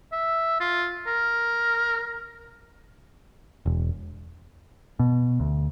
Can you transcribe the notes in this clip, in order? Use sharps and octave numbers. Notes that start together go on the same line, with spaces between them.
E5
F4
A#4
E1
B2
D2